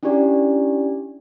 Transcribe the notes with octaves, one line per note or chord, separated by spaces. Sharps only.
C#4 D4 E4 G4 D5